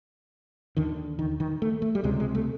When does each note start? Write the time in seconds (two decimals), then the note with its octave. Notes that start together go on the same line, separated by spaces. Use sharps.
0.77 D#2 D3 D#3
1.19 D#3
1.40 D#3
1.62 A3
1.82 A3
1.95 G3
2.04 C#2 C3 G#3
2.20 G#3
2.35 A3